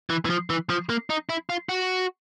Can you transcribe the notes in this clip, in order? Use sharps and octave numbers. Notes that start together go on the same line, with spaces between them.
E3
E3
F3
E3
F3
A#3
D#4
E4
F4
F#4